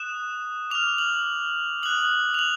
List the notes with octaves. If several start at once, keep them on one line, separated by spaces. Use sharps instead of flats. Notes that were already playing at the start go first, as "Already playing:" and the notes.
Already playing: D#6 F#6 E7
D6 F6 F7
F#7
D#6 F#6 F#7
F7
F#7